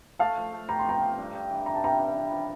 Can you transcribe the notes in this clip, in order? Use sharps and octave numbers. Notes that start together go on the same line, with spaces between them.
A3 F5 A5
F3
A3
G4 A#5
C6
F3 G5 A#5
F3
G2
G2
E3
E3 A#5
A5
G3 G5 A#5
G2
E4
F3